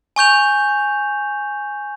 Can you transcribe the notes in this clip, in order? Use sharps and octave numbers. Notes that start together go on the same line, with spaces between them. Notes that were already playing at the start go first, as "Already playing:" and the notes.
G#5 C#6 G6 F7